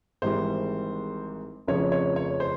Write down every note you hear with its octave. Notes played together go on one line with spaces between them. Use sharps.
G#1 G#2 E3 G3 C5
F1 F2 C#3 F3 C#5
C#5
C#5
C5